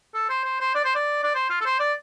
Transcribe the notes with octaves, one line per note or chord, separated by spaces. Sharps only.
A4
C5
C5
C5
D5
C5
D5
D5
C5
F4
A4
C5
D5